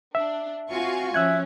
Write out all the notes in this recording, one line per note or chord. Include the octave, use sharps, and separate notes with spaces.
D4 E5
C4 F4 F#4 F5 G#5 C#6
F3 C#4 E5 E6 F#6 G#6